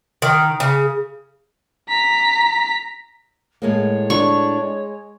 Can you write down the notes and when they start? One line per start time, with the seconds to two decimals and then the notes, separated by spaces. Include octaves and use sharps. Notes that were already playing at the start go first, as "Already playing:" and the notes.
0.22 D#3
0.60 C#3
1.89 A#5 B6
3.62 A2 G#3 A#3 C#5
4.10 D4 C#6
4.61 G#3